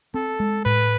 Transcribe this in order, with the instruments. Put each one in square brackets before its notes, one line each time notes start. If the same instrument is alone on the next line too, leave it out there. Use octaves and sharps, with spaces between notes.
[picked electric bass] C4 [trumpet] A4
[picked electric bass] G#3
[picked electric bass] A2 [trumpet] B4